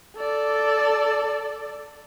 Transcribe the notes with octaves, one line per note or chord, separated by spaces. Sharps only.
A4 D5